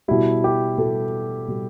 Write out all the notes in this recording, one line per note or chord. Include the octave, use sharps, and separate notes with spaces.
B2 G3 E4
G4
B2 G3 A4
B2 G3